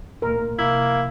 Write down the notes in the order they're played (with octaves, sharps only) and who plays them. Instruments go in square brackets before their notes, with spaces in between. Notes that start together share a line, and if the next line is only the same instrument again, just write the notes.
[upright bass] D1 A#2 [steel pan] A#4
[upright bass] C3 F3 [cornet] A#3 [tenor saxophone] E4